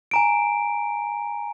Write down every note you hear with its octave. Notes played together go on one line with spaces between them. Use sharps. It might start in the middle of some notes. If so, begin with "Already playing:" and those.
G#5 A#5 D7